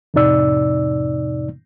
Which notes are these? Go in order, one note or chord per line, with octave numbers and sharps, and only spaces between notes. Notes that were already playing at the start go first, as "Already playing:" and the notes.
F2 A2 C3 D#4 D5 E6